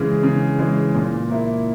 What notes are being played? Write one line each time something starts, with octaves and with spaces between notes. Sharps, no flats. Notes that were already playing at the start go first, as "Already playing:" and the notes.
Already playing: C#3 E3 G#3
C#3
E3 G#3
A#2
A#3 E4